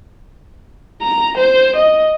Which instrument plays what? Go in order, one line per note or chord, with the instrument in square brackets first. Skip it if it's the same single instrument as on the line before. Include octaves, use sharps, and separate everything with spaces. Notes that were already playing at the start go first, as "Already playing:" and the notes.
[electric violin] A#5
C5
D#5